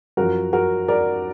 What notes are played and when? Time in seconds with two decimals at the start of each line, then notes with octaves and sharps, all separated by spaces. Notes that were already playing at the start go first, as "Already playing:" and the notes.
0.17 F#2 F3 F#4 A#4
0.53 F#4 A#4
0.88 A#4 D5